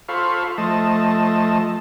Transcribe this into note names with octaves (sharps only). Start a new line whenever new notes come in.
F4 A4 C5 F5 B5 C#6
F3 A3 D#5 A5